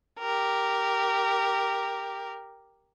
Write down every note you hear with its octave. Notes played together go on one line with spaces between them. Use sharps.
G4 A#4